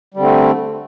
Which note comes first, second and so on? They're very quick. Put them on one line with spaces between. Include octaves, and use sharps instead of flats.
G3 D3 C4 A3